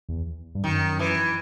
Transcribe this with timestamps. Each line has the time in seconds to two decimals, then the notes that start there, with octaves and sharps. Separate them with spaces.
0.09 E2
0.55 G2
0.64 F#2 D#3
0.99 E3